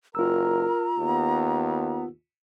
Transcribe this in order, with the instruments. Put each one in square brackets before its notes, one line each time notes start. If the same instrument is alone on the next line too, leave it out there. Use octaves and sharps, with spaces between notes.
[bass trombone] F#1 [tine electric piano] F4 E6 [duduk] A#4 [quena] A#5
[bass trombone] D#2 [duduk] B3